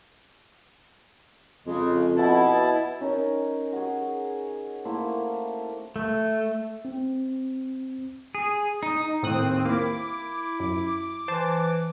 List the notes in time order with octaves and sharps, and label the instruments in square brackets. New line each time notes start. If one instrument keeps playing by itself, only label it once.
[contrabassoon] F2 [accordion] C#3 G#3
[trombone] B2 [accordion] E4 A5
[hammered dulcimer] C#4 D#4 A#4
F#4 G#4
A3 A#3 E4 C5
[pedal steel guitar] A3
[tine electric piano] C4
[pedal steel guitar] G#4
D#4
[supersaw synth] D#2 C4 [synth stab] A2 D#6 F#6
[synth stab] A#3 [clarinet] E4 [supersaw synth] D6
[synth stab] F#2
[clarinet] E3 [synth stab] C5 A5